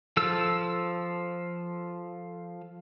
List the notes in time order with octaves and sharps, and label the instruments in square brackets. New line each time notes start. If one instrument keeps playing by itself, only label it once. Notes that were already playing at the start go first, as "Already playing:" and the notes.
[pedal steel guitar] F3 A4 E6